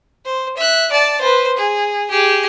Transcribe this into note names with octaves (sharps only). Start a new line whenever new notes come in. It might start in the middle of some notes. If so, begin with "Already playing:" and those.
C5
E5 F#6
D5 A5
B4 C5
G#4
G4 G#4